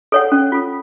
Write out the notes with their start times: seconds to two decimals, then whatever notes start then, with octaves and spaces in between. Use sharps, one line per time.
0.12 A4 C#5 F#5
0.32 C#4
0.52 F4 A4